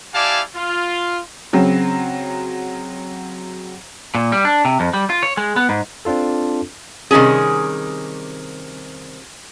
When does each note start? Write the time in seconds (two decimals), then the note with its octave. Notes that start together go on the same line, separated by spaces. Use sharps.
0.14 E4 G4 D5 F5 G#5 A5
0.55 F4
1.53 C#3 F#3 C4
4.15 A#2
4.32 G3
4.45 D4
4.65 C3
4.80 F2
4.94 G3
5.10 F4
5.23 C#5
5.37 G#3
5.56 B3
5.69 G#2
6.05 C4 D4 F4 A4
7.11 C3 D#3 G3 C#4 G#4